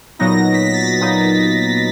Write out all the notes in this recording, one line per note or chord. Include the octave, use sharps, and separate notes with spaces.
A#2 F#3 B3 D#4 A#6
A#6
B6
A#6
A6
A#2 F#3 B3 D#4